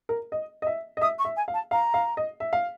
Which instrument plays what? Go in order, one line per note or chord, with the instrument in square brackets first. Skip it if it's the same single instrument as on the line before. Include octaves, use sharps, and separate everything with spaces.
[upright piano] A#4
D#5
D#5
E5
D#5
[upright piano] E5 [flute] D#6
[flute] C#6
[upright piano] E5
[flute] G#5
[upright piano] F5
[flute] A5
[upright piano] F5 [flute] A#5
[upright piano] F5
D#5
E5
F5